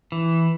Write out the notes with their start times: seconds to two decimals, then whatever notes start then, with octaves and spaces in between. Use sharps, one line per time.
0.12 E3